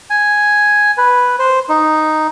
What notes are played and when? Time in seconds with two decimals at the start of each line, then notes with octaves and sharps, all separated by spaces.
0.10 G#5
0.98 B4
1.39 C5
1.69 D#4